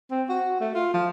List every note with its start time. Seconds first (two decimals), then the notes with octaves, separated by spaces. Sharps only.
0.11 C4
0.29 F#4
0.60 A3
0.75 F4
0.93 F3